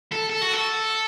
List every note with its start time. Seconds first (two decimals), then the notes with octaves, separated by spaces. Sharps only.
0.12 A4
0.29 A4
0.41 F#4
0.53 A4